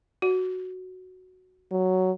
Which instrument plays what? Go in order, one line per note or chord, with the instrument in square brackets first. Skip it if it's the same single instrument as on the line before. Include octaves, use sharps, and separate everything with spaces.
[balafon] F#4
[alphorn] F#3